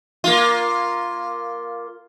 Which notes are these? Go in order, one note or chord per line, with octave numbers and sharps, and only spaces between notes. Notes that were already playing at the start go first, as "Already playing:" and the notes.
A#3 F4